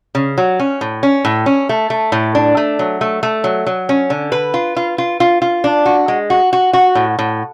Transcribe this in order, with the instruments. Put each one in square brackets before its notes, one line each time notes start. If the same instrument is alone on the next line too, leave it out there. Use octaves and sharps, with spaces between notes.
[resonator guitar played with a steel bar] C#3
F#3
C#4
A2
C#4
A2
C#4
A3
A3
A2
D4
A3
F#3
A3
A3
F#3
F#3
C#4
D3
B4
F4
F4
F4
F4
F4
D4
F#4
G#3
F#4
F#4
F#4
A2
A2